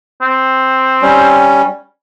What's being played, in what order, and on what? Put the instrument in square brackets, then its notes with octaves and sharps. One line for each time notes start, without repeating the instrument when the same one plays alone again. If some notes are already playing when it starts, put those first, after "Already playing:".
[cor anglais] C4
[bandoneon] G3 C#4